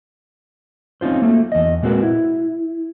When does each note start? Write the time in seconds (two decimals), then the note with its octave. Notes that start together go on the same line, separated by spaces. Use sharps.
1.01 C4 C#4 D#4 F4 C5
1.22 F#3 A3 A#3
1.52 E2 D#5
1.82 A#2 G#3 C4 F#4 A#4 B4
2.03 E4